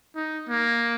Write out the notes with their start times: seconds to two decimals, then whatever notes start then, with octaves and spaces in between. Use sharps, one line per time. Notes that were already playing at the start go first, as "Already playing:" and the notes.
0.16 D#4
0.49 A#3